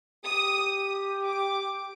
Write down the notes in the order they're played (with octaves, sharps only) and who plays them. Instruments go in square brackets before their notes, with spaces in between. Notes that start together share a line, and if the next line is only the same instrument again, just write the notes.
[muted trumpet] G4 [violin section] D#6
[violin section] D6